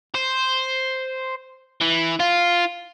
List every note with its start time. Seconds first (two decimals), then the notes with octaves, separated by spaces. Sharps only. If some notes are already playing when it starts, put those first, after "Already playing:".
0.15 C5
1.81 E3
2.20 F4